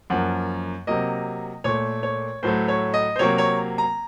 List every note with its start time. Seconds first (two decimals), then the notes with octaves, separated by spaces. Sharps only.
0.10 F#2 F3 A#3 F#5
0.87 C3 F#3 A#3 D#5
1.64 A#2 A3 C#5
2.03 C#5
2.43 A2 F#3 A3 C5
2.68 C#5
2.94 D#5
3.16 C5
3.19 C3 F#3 A#3 C#5
3.38 C#5
3.78 A#5